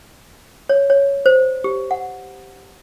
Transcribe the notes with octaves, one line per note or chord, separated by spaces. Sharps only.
C#5
C#5
C5
G4
F#5